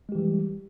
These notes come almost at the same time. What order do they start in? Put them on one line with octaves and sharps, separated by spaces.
G#3 G4 E3 G3